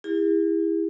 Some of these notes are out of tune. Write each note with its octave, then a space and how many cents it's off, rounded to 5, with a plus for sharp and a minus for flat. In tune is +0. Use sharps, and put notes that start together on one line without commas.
E4 +0 G#4 -45